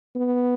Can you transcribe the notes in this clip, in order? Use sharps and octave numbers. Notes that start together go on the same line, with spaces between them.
B3